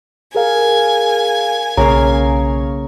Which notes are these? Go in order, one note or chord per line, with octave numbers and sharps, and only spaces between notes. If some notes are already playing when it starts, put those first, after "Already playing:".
G#4 A#4 F5 G#5
B1 C#3 A#3 F5 A#5 C#6